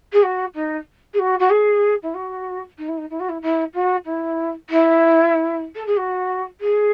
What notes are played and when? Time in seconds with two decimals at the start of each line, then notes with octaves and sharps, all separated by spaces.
0.13 G#4
0.23 F#4
0.55 D#4
1.13 G#4
1.19 F#4
1.39 F#4
1.50 G#4
2.03 E4
2.14 F#4
2.78 D#4
2.88 E4
2.97 D#4
3.10 E4
3.20 F#4
3.29 E4
3.42 E4
3.74 F#4
4.05 E4
4.70 E4
5.75 A4
5.86 G#4
5.97 F#4
6.60 G#4